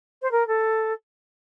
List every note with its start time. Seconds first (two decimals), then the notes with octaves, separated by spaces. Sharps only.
0.22 C5
0.32 A#4
0.48 A4